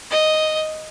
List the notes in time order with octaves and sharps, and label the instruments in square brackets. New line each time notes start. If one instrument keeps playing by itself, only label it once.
[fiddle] D#5